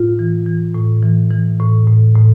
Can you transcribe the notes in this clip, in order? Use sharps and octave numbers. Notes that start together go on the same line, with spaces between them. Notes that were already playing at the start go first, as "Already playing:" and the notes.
Already playing: A2 F4
E3
E3
A2
E3
E3
A2
A2
A2